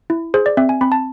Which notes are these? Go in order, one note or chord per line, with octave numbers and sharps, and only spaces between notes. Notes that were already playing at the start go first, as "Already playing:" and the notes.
E4
G#4 C5
D5
C4 E5
G#5
C4 B5
A5